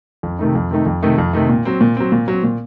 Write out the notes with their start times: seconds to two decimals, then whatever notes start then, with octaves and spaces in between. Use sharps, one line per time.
0.23 F2
0.39 C3 D#3 A3 D#4
0.55 F2
0.71 C3 D#3 A3 D#4
0.86 F2
1.03 C3 D#3 A3 D#4
1.18 F2
1.33 C3 D#3 A3 D#4
1.49 A#2
1.65 F#3 C4
1.81 A#2
1.97 F#3 C4
2.12 A#2
2.28 F#3
2.33 C4
2.43 A#2